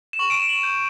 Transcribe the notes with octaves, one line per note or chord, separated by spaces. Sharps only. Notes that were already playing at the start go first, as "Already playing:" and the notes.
E7
C#6 F#7
D7
E7
F#7
G6